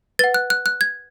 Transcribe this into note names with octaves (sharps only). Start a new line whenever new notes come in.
B4 F#5 A6
F#6
F#6
F#6
G#6